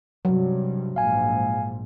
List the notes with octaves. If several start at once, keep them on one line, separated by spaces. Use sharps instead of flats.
G2 C3 F#3
A#1 G#2 F5 G#5